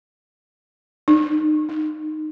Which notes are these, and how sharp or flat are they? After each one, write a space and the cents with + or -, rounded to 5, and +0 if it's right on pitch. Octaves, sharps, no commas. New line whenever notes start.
D#4 -30
D#4 -10